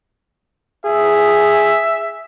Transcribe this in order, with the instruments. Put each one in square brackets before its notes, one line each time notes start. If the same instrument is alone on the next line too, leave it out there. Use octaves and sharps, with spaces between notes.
[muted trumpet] G#4 [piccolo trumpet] E5